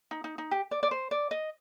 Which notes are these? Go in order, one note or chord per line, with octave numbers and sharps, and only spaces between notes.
D#4
D#4
D#4
G4
D5
D5
C5
D5
D#5